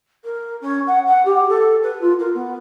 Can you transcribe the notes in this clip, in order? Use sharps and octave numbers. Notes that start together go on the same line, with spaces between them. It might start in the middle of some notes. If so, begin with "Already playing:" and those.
A#4
C#4
F#5
F#5
G4
A4
B4
F4
A#4
B3